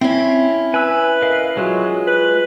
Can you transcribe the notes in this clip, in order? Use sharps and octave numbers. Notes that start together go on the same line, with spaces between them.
C4 C#4 E4
B4 G#5 E6
A#4 D#5 F5
F#3 G#3 F4
B4